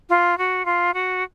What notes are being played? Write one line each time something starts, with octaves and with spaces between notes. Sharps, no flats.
F4
F#4
F4
F#4